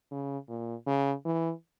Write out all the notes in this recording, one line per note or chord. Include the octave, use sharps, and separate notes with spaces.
C#3
A#2
C#3
E3